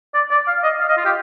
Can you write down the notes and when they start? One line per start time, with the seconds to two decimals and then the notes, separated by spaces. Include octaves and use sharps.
0.14 D5
0.30 D5
0.47 F5
0.63 D#5
0.81 F5
0.89 D#5
0.97 F4
1.05 G4